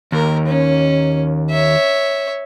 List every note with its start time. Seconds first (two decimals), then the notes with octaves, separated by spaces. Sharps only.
0.12 D#2 A#4
0.47 C#4
1.50 C#5 E5